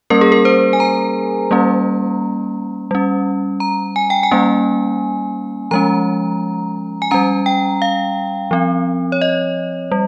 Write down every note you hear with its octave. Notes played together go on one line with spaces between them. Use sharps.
G3 A#3 C#4 A#4
G#4
A#4
C5
G#5
A#5
G3 A#3 C#4
G3 C#4
A#5
G#5
G5
G#5
G3 A#3 C#4
F3 G#3 C#4 A#5
G#5
G3 C#4 A#5
G5
F5
F3 C4
C#5
D#5
G3